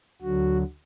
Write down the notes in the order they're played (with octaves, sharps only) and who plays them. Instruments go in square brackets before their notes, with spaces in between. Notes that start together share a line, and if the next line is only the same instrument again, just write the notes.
[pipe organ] D2 D3 F#3 F#4